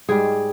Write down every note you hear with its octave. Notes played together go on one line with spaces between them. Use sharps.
G#2 G3 G#4